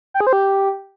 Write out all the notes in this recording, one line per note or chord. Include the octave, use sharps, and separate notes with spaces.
G5
G#4
C5
G4